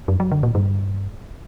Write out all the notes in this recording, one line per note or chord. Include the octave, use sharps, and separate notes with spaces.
F#2
F#3
D3
A#2
G2